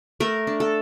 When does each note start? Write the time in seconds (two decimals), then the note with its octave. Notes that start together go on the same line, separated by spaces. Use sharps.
0.20 A3 A#4
0.47 D4
0.60 A4